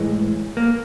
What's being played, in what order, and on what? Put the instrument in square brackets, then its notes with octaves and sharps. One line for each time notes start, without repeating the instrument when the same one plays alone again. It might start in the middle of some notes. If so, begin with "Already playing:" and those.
Already playing: [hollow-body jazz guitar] A2 E3 G#3
A#3